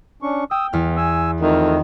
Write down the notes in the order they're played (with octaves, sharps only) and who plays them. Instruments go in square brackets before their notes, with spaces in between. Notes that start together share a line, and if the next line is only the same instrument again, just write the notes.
[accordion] C#4 D4 C#6
[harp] G5 [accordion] D#6 E6
[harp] E2 F6 [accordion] B3
[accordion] G#5 E6
[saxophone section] F2 D#3 [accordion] A3